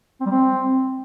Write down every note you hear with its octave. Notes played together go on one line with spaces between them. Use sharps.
C4
G3
C4